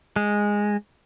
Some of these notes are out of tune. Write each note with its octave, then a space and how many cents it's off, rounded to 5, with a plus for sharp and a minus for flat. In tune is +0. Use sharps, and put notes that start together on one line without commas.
G#3 -5